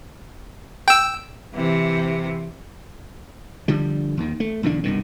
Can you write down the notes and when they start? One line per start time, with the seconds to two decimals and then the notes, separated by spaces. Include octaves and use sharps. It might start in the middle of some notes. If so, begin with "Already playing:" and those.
0.88 G5 E6
1.54 C3 E3
3.68 D3 F3 G3
4.17 D#2 D#3
4.40 A3
4.63 B1 E2 D3 D4
4.84 C2 G2 B2 D#3